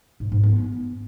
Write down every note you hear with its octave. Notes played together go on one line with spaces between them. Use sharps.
G#2
G#2
B3